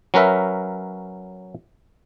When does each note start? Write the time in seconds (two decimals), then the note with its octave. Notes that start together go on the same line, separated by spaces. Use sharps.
0.14 F#3 C#4 A#4 B4 E5